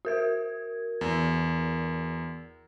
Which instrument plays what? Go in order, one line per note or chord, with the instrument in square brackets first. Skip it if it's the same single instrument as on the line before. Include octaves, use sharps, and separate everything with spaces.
[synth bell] F#4 A#4 G#6
[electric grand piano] E2